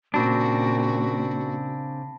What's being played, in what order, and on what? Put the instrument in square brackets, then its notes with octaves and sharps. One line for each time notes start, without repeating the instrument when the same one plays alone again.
[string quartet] A#2 [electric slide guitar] C#3 C4 D4 [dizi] F#4 [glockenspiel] A5 B5 A#6